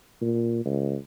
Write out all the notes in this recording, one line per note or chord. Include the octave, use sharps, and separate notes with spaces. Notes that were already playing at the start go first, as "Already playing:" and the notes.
A#2
C#2